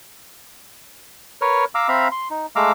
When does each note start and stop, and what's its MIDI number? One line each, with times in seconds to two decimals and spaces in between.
1.41 1.65 70
1.41 1.65 71
1.41 1.65 73
1.41 1.65 89
1.75 1.88 77
1.75 1.88 82
1.75 1.88 86
1.75 1.88 88
1.88 2.08 60
1.88 2.08 76
1.88 2.08 77
1.88 2.08 82
1.88 2.08 83
2.12 2.28 84
2.30 2.46 63
2.56 2.72 56
2.56 2.72 57
2.56 2.72 77
2.56 2.72 82
2.56 2.72 86
2.56 2.72 88